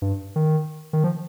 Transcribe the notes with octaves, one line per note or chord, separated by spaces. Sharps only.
G2
D#3
D#3
F3